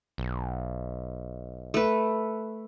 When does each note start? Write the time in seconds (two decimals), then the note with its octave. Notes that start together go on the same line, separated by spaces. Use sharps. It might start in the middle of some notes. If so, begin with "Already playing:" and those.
0.18 B1
1.74 A3 B4